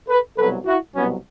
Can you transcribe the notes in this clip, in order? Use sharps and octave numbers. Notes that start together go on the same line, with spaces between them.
A4 B4
C2 B2 F#3 A4 B4
E4 F#4
C2 B2 F#3 B3 C#4